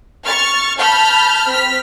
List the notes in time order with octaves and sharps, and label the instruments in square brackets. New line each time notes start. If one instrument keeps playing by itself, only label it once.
[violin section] C#6 F6 A6
A5 B5 F6 G6
C4 F6 B6